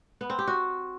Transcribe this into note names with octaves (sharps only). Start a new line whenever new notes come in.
B3
C4
G4
F#4